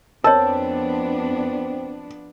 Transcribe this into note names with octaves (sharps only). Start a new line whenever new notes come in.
F2 B3 C4 D4 A#4 C#5 A5